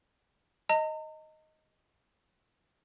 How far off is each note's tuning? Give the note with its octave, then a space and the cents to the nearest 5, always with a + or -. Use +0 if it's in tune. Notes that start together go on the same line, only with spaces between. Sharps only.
D#5 +5 A#5 -45